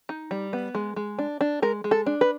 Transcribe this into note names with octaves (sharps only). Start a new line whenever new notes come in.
D#4
G3
B3
G#3
G#3
D4
D4
G#3 A#4
G#3
A4
D4
B4